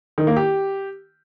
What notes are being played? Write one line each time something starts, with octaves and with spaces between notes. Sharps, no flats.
D#3
A#3
G4